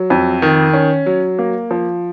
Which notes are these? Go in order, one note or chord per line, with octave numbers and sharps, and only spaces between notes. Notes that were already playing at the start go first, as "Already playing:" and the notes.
Already playing: F#3
F2
D#3
C#4
F#3
A#3
F3